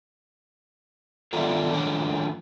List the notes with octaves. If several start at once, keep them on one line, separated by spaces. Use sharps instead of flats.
D#3 B3 D4 E4 F4 A4
D#3 F3 A3 C#4 D4